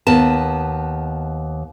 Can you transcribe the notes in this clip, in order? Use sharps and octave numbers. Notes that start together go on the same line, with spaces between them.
D#2 B3 A5